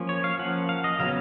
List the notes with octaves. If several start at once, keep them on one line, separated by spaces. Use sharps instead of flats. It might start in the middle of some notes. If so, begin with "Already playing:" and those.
Already playing: F3 A#3 C#4
C#5
F5
F3 A#3 C#4 F#5
F5
D#5
C#3 F#3 B3 F5